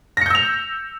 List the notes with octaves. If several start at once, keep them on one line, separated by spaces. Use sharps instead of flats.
E6 G6 A#6 C#7 F7